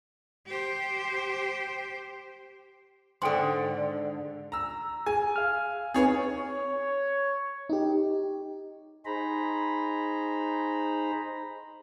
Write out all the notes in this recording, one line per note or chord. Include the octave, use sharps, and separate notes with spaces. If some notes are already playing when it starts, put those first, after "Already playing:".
G4 C5
G#2 D3 A4 G5 C6
A#5 E6
G#4 G#5
F5 F6
C4 D#4 G#4 B4 C#5
C#5
D#4 G4
D#4 G#4 C5 A#5 B5